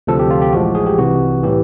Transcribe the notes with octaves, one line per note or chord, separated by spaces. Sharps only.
D2 C3 F3 A4
G4
F4
G4
A1 A2 F3 G#3 F#4
G#4
G4
C2 C3 E3 F#4
A2 E3 G4